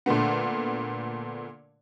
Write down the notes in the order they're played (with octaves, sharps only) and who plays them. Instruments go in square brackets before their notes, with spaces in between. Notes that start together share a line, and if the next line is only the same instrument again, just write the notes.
[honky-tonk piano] A#2 D3 A3 B3